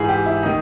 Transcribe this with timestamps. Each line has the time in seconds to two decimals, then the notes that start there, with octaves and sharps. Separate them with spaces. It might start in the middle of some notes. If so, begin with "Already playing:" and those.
Already playing: G#2 E3 G#4
0.09 G4
0.26 E4
0.43 D#3 D#4